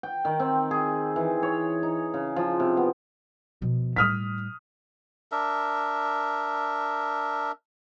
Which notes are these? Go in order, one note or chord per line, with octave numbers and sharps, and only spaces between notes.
G5
D#3
C4
G#4
E3
C#5
D#4
C#3
F3
C3
B3
B2 F3
A2 G3 D#6 F6 B6
D4 A#4 E5